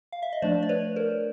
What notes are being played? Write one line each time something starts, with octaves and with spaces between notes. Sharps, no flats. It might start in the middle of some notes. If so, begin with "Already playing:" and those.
F5
E5
D#5
F3 A3 D4 C5 D5
D5
B4 C#5
A#4 C5